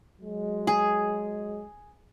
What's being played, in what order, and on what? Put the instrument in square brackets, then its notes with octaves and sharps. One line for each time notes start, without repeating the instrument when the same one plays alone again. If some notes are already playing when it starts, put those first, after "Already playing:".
[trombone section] F#3 G#3
[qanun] G#4